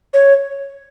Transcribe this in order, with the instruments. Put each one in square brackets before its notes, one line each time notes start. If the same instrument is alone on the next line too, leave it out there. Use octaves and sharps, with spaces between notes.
[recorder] C#5